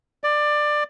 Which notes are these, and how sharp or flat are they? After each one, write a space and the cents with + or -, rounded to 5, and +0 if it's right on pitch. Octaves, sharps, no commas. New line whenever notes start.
D5 +20